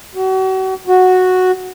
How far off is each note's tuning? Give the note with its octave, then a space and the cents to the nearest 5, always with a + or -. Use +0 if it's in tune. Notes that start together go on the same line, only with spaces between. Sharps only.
F#4 +35
F#4 -5